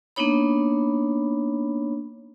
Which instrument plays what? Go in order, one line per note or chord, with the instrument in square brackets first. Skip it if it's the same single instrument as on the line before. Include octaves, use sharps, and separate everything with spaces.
[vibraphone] A#3 B3 D4 D#4 C#5 B5